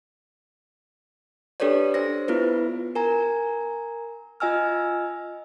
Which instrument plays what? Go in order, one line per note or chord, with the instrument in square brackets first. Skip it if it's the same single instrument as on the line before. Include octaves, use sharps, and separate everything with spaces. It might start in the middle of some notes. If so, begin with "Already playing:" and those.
[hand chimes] D4 G4 A4 B4 C#5 D5
D4 C5 A#6
B3 E4 F4 B4
A#4 G#5 A#5
F4 D#5 G#5 E6 F6